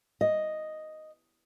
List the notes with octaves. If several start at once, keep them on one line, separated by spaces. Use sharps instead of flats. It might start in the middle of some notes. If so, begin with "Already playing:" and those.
D#5